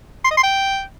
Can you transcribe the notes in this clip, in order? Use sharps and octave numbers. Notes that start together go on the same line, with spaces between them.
C6
D#5
C6
G5